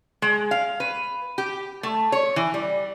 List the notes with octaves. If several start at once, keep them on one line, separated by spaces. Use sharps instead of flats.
G#3
F5
B4
G4
A3
C#5
E3
G3